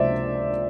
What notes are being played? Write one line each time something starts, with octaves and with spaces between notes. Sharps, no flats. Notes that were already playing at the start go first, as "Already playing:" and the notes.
Already playing: C#2 C3 F3 A#3 C5 D5 E5